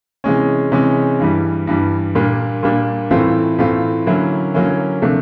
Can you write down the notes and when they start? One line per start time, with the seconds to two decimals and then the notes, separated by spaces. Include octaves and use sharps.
0.24 C3 E3 G#3 C#4
0.72 C3 E3 G#3 C#4
1.19 G2 E3 G3
1.67 G2 E3 G3
2.15 A#2 G3 A#3 D4
2.63 A#2 G3 A#3 D4
3.11 A2 E3 A3 C4 F4
3.58 A2 E3 A3 C4 F4
4.06 D3 F#3 A#3 C#4 E4
4.54 D3 F#3 A#3 C#4 E4
5.02 C3 F3 A3 D4